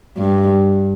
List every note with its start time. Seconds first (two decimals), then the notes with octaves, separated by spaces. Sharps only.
0.18 G2